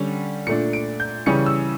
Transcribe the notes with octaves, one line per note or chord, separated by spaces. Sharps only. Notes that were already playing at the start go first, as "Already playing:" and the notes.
Already playing: D3 G3 C#4
A#2 A3 D4 C#7
D7
G6
C#3 E3 G3 C#4 C#7
E6